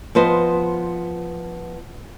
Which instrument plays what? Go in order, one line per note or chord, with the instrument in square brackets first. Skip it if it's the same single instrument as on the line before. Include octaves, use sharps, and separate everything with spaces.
[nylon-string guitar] F3 B3 B4 C5 D#5